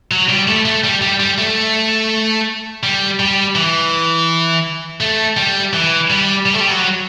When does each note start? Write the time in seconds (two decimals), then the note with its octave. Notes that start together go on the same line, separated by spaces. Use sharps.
0.11 F#3
0.29 G3
0.48 A3
0.65 A3
0.84 G3
1.02 G3
1.20 G3
1.38 A3
2.83 G3
3.20 G3
3.55 E3
5.01 A3
5.37 G3
5.73 E3
6.10 G3
6.46 G3
6.54 A3
6.61 G3
6.70 F#3